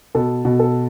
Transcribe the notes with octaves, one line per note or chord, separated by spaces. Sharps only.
B2 A4
B2
A4